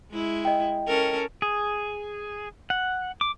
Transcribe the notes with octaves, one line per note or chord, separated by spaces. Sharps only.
G#3 E4
D#5 G5
C#4 A4 A#4
G#4
F#5
D6